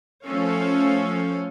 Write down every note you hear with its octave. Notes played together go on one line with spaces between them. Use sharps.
F3 A3 C#4 A4 C#5 F5